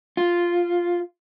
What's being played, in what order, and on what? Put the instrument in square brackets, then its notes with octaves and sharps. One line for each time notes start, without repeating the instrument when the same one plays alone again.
[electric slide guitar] F4